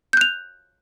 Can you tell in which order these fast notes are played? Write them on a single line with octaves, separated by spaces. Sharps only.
G6 F#6 F7